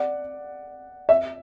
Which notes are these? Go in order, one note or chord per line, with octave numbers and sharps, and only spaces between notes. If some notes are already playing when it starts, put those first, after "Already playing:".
Already playing: D5 F#5
E5